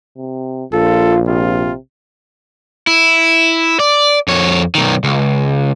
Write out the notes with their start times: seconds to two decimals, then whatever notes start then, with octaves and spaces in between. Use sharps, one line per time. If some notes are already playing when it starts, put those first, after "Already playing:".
0.17 C3
0.73 A#1 F4 A4
1.27 C3 F4
2.87 E4
3.80 D5
4.28 F2 C#5
4.75 B1 D#3
5.04 C#2